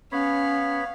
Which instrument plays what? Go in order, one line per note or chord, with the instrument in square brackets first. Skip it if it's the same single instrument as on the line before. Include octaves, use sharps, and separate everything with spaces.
[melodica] B3 C#5 B5 [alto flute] C#4 [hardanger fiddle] F5